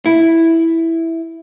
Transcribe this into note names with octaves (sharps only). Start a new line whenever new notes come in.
E4